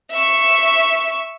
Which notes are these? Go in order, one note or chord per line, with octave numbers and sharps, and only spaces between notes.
E5 C#6